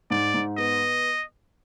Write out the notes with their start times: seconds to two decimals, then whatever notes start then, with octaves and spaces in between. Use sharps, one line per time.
0.10 G#2 D5
0.34 G#2
0.57 B3 D#5